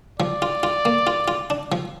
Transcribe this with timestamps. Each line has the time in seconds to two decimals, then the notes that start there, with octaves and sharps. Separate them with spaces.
0.20 F3 D5
0.42 F4
0.63 F4
0.85 A#3
1.07 F4
1.28 F4
1.50 D4
1.72 F3